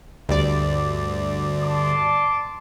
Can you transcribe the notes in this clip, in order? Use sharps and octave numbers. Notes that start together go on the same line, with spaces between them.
D2 G2 D5
A5 C6 D6